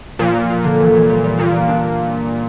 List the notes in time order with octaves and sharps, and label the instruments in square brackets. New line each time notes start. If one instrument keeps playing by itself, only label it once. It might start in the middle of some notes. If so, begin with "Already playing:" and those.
[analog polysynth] A#2 [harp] F3
[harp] F4
F4
D3
E3
E3
G3
G3
[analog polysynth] A#2 [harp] F4
[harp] A#3
D4